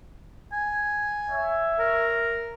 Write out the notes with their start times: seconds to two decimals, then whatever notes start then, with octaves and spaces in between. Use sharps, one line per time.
0.52 G#5
1.30 C#5 E5
1.79 A#4